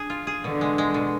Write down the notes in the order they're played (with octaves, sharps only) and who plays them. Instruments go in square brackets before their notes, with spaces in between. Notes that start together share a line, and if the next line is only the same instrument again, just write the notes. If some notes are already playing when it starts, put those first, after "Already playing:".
Already playing: [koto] D4 G#4
F4
G#4
[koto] B2 [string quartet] D3
[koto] G#3
G#3
B2